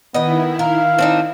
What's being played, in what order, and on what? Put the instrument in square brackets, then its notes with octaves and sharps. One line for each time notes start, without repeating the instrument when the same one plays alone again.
[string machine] D#3 E4 [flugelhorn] B3 [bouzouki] D#5 G5
[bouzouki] A#4 [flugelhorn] F5
[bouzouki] C4 D4 D#4